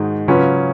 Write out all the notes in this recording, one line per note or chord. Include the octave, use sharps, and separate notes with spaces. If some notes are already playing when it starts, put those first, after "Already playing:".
Already playing: G#2 D#3 G#3 D#4 F#4
C#3 F#3 C#4 F4 B4